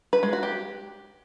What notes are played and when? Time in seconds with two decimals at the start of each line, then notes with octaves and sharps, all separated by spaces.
0.13 B4
0.23 G#3
0.33 F#4
0.43 G4